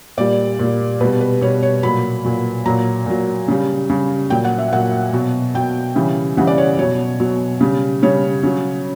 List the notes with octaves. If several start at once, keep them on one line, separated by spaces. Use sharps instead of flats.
A#2 G3 D5
A#2 G3
B2 G3 B4
B4
B2 G3 C#5
C#5
A#2 F#3 B5
A#2 F#3
A#2 F#3 A#5
A#2 F#3
C#3 G3
C#3 G3
A#2 F#3 G5
F#5
E5
A#2 F#3 F#5
B2 F#3
B2 F#3 G5
C#3 E3 G3
C#3 E3 G3 F#5
D5
C#5
B2 F#3 C#5
B2 F#3
C#3 G3
C#3 G3 C#5
C#3 F#3